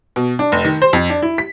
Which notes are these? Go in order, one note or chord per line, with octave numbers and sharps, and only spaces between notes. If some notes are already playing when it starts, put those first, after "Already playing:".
B2
D4
F1
D#3
C5
F2
D4
E4
B6